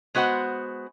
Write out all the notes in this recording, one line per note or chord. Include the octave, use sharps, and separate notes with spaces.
G#3 B3 F#4 C5 F#5